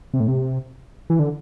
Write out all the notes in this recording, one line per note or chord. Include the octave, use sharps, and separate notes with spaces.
C3
A2
C3
E3
D3